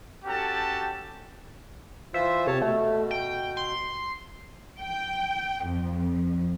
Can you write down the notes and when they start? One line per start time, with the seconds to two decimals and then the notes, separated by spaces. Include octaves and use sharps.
0.24 C#4 F#4 G4 A4 A5
2.14 E3 F4 C5 E5
2.47 C3 C#5 A5
2.62 B2 A3
3.11 G5
3.57 C6
4.80 G5
5.65 F2